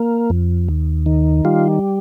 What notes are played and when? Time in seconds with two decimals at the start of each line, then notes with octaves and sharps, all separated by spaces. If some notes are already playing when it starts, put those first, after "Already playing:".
Already playing: A#3
0.30 F2
0.68 D#2
1.06 D#3
1.45 G3 F4